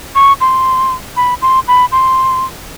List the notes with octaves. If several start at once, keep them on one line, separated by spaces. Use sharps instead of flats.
C#6
C6
B5
C6
B5
C6